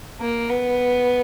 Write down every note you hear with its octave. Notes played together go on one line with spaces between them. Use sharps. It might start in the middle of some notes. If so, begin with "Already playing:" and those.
A#3
B3